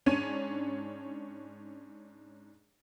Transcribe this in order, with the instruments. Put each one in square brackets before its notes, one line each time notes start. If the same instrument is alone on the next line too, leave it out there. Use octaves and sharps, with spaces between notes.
[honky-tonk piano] G#2 C#4 D4 C#5 G#6 D#7